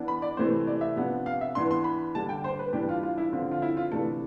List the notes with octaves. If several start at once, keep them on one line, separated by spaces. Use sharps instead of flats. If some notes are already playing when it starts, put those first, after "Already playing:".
Already playing: E3 B3 D4
B5
D5
C3 E3 A3 C4 C5
D5
E5
C3 F3 B3 D4
F5
E5
E3 B3 D4 C6
C6
B5
D3 G3 D4 A5
G5
C5
B4
E3 G3 D4 G4
F4
F4
E4
D3 F3 C4 F4
F4
E4
F4
C3 E3 A3 D4 A4